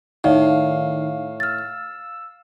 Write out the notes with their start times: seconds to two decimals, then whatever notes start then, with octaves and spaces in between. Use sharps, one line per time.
0.24 A2 D#3 D#4 D5 F5
1.40 E6 F6 A6